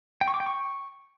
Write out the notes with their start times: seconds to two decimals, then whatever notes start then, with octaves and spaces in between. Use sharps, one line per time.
0.21 G5
0.28 C#6
0.34 D6
0.40 G5
0.46 C#6